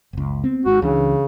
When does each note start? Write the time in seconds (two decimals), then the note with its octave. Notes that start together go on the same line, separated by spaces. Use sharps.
0.13 F#1 C#2
0.44 B3 C4
0.65 G#1 G#2 F#4
0.82 C#2 C#3 E3 D4